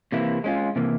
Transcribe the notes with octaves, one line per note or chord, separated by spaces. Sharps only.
C3 E3 A#3 E4
G#3 C#4 F4
C3 E3 A#3